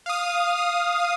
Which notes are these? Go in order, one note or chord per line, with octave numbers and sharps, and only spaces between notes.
F5 D#6